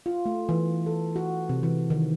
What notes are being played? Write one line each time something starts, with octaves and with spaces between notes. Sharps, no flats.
F4
A3
E3
A4
F#4
C3
E3
D#3